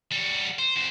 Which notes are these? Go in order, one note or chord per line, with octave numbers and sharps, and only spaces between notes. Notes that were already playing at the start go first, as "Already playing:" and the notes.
G3 F#4
C5
E2 C5